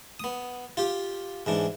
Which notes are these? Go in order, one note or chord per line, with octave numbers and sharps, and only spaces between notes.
B3 D#6
F4 G4
G#2 E3 D4